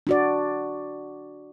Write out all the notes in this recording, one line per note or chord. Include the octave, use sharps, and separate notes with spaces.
D4 F#4 D5